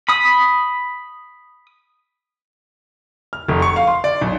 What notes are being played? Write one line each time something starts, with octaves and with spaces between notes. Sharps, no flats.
B5 D#6
F6
F1
C#6
F5
C6
D5
B1